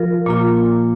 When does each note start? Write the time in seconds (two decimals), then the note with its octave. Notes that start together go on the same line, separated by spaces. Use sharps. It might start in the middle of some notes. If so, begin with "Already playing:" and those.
Already playing: F3 F4 A#4
0.26 A#2 A#3 F4